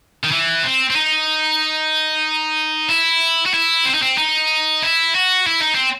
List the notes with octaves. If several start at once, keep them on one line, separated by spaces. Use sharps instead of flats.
D#3
E3
C4
C4
D#4
E4
F#4
E4
C4
D#4
C4
D#4
E4
F#4
E4
D#4
C4